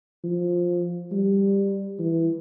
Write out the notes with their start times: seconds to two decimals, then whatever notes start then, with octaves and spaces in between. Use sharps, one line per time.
0.24 F3
1.12 G3
1.99 E3